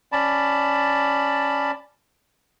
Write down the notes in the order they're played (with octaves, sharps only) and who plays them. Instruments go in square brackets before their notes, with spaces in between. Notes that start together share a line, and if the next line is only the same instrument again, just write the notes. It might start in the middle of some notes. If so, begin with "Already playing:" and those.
[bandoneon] C#4 D5 A5 B5